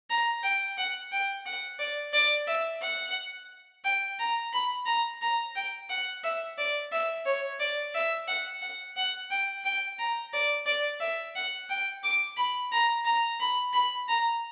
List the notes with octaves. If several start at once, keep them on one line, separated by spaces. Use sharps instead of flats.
A#5
G5
F#5
G5
F#5
D5
D5
E5
F#5
G5
A#5
B5
A#5
A#5
G5
F#5
E5
D5
E5
C#5
D5
E5
F#5
F#5
F#5
G5
G5
A#5
D5
D5
E5
F#5
G5
D6
B5
A#5
A#5
B5
B5
A#5